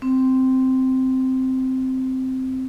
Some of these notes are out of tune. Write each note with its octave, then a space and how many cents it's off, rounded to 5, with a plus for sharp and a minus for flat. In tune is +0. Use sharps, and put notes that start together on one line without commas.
C4 -5